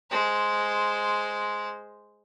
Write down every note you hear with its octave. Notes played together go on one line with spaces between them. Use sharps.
G#3 C5